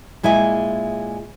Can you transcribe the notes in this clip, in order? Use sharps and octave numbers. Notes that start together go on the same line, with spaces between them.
A#2 G#3 E4 D#5 G#5